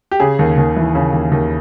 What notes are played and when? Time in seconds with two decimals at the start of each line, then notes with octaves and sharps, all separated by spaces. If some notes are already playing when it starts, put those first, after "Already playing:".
0.11 G4
0.20 C#3 G#4
0.39 D#2
0.57 D#2
0.76 E3
0.95 C#3
1.13 D#2
1.32 D#2